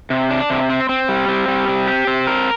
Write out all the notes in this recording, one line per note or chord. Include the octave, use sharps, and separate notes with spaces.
C3
D4
C3
C4
C4
G3
C4
G3
C4
G4
C4
A#4